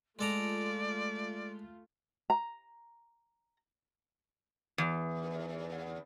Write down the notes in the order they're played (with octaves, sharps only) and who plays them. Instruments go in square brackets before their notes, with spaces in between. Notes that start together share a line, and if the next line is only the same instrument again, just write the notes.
[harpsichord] G#3 A4 A#5 [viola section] A3 F4 [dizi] D5
[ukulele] A#5
[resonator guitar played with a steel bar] E2